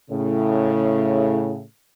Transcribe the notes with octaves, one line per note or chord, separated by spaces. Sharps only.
A2 C#3